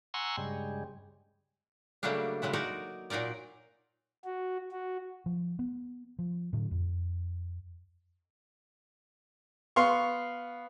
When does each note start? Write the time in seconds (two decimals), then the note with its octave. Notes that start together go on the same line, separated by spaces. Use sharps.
0.14 F#5 G#5 A#5 C6 C#6 E6
0.37 G2 C#3 G3 G#3
2.03 C#3 F#3 G3 A3 A#3 D4
2.42 C#3 F#3 G#3 E4
2.53 D#4 F#4 A#4 D5
3.10 A#2 F#3 D#4 A#4 D5
4.25 F#4
4.72 F#4
5.26 F3
5.59 B3
6.19 F3
6.53 A2 D3 F#3
6.71 F2
9.76 B3 F5 C6 C#6